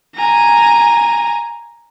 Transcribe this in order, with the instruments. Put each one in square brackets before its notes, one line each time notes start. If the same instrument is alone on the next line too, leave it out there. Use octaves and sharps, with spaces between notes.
[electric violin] G#5 A#5